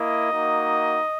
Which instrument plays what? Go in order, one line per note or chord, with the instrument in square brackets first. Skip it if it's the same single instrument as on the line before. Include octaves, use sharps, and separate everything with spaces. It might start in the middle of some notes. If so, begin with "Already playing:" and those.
Already playing: [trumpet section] A#3 E4 D#5
A#3 D#4 F#4